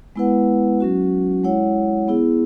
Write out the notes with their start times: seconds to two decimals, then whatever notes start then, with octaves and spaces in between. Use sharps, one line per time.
0.16 G#3 B3 E4 B4 F#5
0.80 F#3 C#4 F#4
1.44 G#3 E4 C#5 F#5
2.08 B3 E4 G#4